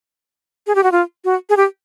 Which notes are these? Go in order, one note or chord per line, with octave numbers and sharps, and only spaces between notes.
G#4
G4
F#4
F4
F#4
G#4
G4